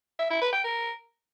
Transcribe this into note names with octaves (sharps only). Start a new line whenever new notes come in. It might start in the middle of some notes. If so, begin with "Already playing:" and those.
E5
E4
B4
G5
A#4